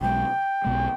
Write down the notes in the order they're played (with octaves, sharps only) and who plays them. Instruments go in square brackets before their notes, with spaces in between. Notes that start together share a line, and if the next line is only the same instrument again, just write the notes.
[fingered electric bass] B1 B2 G#3 [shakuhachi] G5
[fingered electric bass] B1 B2 G#3